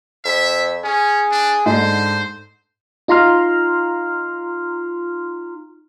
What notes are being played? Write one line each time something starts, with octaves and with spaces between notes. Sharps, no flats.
F2 E5
C#4 G#4
D4
G#2 D3 C5
D#4 F4 A#5 C6 F6